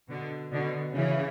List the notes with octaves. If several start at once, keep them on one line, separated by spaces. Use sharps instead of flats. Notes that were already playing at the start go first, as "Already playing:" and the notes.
B2 D3
B2 D3
C#3 E3